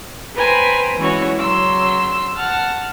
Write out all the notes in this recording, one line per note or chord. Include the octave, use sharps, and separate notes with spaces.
B4 C5 G5 G#5 A#5 B5
E3 G#3 C#4 E4 F#4 C#5
C#3 F#3 C6 E6
F#5 A5 F6